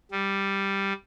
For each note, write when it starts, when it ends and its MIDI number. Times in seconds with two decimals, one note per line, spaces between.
0.11 0.93 55